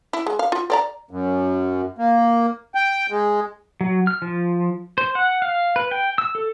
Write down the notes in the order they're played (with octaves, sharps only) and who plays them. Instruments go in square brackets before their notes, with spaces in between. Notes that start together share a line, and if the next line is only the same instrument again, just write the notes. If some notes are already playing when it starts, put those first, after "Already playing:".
[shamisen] E4
G#3
F5
F4
C4 D5 A#5
[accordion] F#2
A#3
G5
G#3
[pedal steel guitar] F#3
F6
F3
C5
F#5
F5
B4
G5
E6
A4